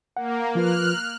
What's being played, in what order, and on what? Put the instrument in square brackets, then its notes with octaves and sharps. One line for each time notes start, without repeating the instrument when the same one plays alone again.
[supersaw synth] A#3 [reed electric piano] F#5
[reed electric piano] F3 F4 B4 [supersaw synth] F6 F#6